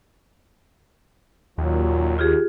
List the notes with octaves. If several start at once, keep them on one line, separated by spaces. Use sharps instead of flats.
D#2 A#2 F#3
F4 G4 G#4